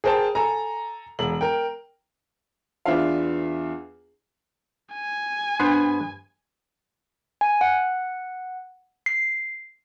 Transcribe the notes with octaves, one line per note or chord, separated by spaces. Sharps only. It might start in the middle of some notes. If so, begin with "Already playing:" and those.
G#4 A#4 C5 G5 A5
A4 G#5 A#5
E1 F#7
A#4 G5
E2 B3 D4 F4 E5 F5
G#5
G2 B3 B4 C5
G#5
F#5
C7